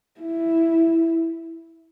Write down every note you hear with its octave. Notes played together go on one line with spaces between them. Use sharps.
E4